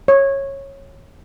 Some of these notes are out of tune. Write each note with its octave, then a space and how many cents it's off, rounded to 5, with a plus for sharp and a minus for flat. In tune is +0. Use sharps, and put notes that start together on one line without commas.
C#5 -15